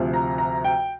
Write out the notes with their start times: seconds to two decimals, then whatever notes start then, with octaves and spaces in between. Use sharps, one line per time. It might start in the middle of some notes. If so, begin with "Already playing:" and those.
Already playing: D2 C3 F3
0.14 A#5
0.38 A#5
0.65 G5